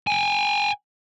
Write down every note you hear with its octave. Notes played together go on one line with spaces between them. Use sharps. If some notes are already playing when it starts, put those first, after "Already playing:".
G5 G#5